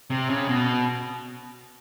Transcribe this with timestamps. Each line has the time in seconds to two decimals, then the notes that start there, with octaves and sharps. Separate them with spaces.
0.10 C3
0.29 C#3
0.49 B2